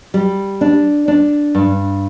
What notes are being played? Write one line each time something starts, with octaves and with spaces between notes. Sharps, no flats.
G3
D4
D4
G2